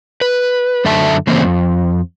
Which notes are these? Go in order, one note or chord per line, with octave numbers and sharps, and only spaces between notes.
B4
F#2 D3 A4 E5 A5
C#3 E3 A3 A#3 C4
F2